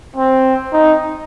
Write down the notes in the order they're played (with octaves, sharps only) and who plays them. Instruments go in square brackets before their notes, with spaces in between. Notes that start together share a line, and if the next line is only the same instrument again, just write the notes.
[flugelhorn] C4
D#4